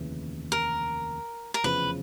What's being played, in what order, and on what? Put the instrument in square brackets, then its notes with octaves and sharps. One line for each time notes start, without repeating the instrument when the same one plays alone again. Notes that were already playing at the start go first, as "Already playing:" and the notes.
Already playing: [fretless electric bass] F1 D#2 C#3 E3
[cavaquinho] A#4
A#4
[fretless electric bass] F1 E2 C#3 F3 [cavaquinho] B4